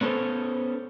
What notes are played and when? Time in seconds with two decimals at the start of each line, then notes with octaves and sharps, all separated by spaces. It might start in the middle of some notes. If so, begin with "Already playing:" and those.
0.01 B3 C#4 A4 C5